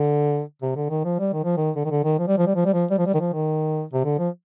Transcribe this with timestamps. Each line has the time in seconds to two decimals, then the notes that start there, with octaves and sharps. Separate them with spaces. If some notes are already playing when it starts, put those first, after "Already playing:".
Already playing: D3
0.62 C3
0.76 D3
0.90 D#3
1.04 F3
1.19 G3
1.33 D#3
1.44 F3
1.57 D#3
1.76 D3
1.85 D#3
1.90 D3
2.04 D#3
2.19 F3
2.27 G3
2.38 F3
2.47 G3
2.55 F3
2.65 G3
2.74 F3
2.90 G3
2.98 F3
3.06 G3
3.14 D#3
3.20 F3
3.33 D#3
3.93 C3
4.05 D3
4.19 F3